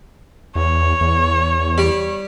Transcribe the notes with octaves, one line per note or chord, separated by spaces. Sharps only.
E2 C#5
E2
G3